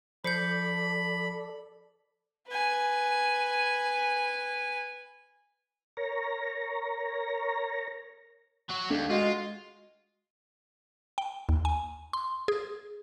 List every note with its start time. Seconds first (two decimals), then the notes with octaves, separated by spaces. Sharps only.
0.24 F3 A4 C5 D5 B5 G6 C7 C#7
2.48 B4 G#5
5.97 A#4 C#5 A#5
8.70 F#3 F#4
8.90 D#2 A3 D4
9.10 G#3 F4 F#4
11.18 G5
11.49 D#2
11.65 G#5
12.13 C6
12.48 G#4